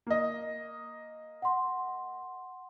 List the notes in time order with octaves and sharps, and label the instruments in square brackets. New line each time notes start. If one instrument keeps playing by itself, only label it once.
[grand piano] A#3 D#5
[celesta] F#5 C6